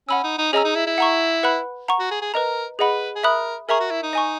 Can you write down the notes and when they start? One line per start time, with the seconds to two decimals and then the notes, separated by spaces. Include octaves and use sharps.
0.09 C#4 F#5 B5 E6
0.24 D#4
0.38 D#4
0.53 C#4 G#4 D#5 A#5 E6
0.65 D#4
0.75 E4
0.87 E4
0.98 F#5 A#5 C#6
1.43 B4 F#5 B5 F#6
1.88 F#5 A#5 C#6
2.00 F#4
2.11 G#4
2.22 G#4
2.34 A#4 B4 D#5 A#5
2.78 G#4 B4 D#5 F#5 B5
3.16 G#4
3.23 A#4 E5 B5 D#6 F#6
3.69 G#4 A#4 E5 A#5 C#6
3.80 F#4
3.91 E4
4.03 D#4
4.13 D#5 G#5 C#6